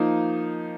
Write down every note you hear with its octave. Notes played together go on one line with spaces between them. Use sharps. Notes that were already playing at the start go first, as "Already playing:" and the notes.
Already playing: F3 A#3 D#4